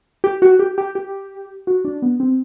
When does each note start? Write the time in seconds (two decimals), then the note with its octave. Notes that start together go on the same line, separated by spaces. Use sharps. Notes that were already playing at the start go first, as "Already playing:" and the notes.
0.24 G4
0.42 F#4
0.59 G4
0.78 G4
0.95 G4
1.67 F#4
1.85 D4
2.02 B3
2.20 C4